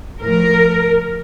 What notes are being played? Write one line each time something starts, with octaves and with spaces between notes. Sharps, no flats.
A2 F3 A#4